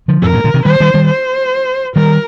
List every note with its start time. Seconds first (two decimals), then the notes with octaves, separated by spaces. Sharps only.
0.08 D3 F3
0.22 F2 A2 A#4
0.33 G2 A#2
0.44 A#2 D3
0.54 C3 D#3
0.65 D#3 G3 C5
0.80 D#3 G3
0.94 D#3 G3
1.08 C5
1.96 D#3 G3 A#4